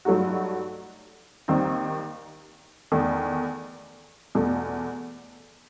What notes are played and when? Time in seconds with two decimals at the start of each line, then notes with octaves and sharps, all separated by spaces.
0.05 G2 F#3 A3 D#4 F#4
1.48 D#2 D#3 G3 C4 D#4
2.92 E2 D#3 A3
4.35 E2 B2 A3